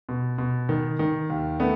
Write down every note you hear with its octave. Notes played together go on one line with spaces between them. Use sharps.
B2
B2
D#3
D#3
D#2
A3 B3